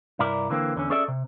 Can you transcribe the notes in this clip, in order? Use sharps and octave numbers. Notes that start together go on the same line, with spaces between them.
C2 G2 E4 A#4 D5
D3 E3 A#3 C4
E2 D3 C#4
C#4 G#4 A4 D5 E5
C3